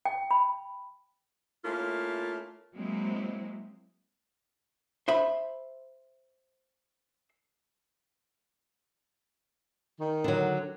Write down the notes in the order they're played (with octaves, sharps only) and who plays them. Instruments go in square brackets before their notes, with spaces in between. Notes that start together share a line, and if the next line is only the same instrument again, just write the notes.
[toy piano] G5
B5
[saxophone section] A3 A#3 C#4 E4 F4
[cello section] F#3 G#3 A#3 C4 E4
[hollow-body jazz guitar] C5 E5 B5
[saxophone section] D#3
[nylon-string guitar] D3 F#3